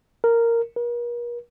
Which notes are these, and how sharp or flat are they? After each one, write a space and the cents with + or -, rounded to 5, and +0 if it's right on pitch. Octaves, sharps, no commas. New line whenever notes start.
A#4 -10
A#4 +40